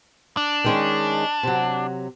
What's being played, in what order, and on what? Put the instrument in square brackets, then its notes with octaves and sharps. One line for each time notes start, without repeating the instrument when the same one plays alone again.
[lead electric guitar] D4
[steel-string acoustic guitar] D#3 G#3 C#4
C3 F#3